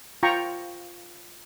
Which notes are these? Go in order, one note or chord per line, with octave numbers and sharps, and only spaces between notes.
F4 G5 A#5 C#6